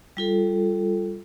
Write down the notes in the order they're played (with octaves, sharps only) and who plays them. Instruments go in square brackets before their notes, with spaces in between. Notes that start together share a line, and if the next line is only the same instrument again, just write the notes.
[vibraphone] G3 F4 A4